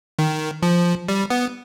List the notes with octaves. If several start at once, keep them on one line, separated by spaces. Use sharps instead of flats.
D#3
F3
G3
B3